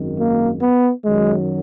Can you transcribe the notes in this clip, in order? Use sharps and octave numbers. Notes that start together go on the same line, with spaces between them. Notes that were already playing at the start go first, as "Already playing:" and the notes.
Already playing: G#1 F#2 D#3
A#3
B3
F#2 D#3 F#3 G#3